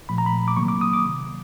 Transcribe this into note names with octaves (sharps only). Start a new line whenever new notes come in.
A#2 F3 A3 B5
A#5
B5
D6
C3 D#3 F#3 A#3 C#6
D6
D#6
D6